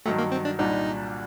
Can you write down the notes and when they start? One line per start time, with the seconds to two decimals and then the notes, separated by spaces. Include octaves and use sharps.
0.06 G2 D#3 F#3 A3
0.18 A#3
0.32 C4
0.45 D4
0.59 C2 A#2 G3 D4 D#4 F#4